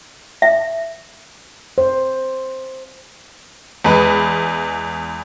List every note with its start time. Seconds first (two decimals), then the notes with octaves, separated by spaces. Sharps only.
0.42 E5
1.78 C5
3.84 E2 G#3 B4